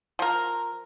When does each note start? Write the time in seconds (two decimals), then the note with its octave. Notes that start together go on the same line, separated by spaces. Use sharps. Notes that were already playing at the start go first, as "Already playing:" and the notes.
0.19 F3 A#4